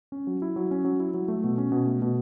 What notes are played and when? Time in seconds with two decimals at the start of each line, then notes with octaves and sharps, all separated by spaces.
0.12 C#4
0.27 F#3
0.42 E4
0.56 F#3
0.71 C#4
0.85 F#3
1.00 E4
1.14 F#3
1.28 A3
1.44 B2
1.58 C#4
1.72 B2
1.86 A3
2.02 B2